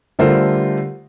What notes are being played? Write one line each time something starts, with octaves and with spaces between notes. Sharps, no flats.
D3 G3 A3 F4 A#4 C5